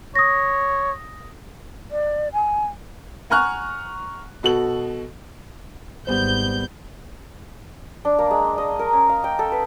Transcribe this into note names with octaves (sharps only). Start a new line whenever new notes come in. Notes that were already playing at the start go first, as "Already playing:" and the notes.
C#5 D#6 A#6
D5
G#5
F#5 G#5 A#5 C#6 F6 F#6
B2 F#4 A4 F#7
G#1 G3 B3 C5 G6
D4
A#3
G#3
C6
D#5
A#4
C#4
F5
G5
A4
B4